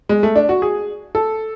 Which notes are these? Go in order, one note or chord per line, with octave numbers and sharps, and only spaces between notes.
G#3
A3
D4
F#4
G#4
A4